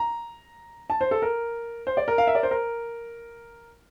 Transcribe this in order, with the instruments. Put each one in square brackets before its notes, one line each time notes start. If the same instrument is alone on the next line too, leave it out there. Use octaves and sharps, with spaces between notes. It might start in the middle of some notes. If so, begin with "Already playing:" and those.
Already playing: [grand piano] A#5
A5
C5
A4
A#4
C5
D5
A#4
F5
E5
D5
C5
A#4